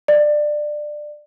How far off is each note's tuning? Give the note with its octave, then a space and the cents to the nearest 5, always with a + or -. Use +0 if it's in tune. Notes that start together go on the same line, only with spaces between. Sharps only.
D5 +20